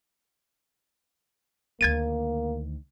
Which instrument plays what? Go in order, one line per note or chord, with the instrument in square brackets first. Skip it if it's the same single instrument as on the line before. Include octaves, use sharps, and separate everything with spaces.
[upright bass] D2 D#3 [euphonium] A#3 [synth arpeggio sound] G#6 A6 D#7